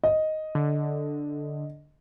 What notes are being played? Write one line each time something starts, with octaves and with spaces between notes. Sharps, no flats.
D#5
D3